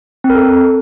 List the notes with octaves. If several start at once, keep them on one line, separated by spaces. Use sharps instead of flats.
C4
A#4
A4